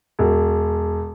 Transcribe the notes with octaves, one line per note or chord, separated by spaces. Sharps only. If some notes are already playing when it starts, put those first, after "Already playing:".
E1